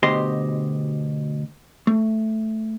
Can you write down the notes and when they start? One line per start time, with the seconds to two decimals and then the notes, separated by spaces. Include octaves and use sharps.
0.03 D2 B2 G4 C5 D#5 C6
1.87 A3